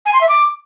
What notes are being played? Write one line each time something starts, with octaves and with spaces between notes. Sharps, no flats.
G#5
C6
E5
D6